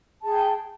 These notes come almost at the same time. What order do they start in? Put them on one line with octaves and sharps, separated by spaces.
A5 G#4 G5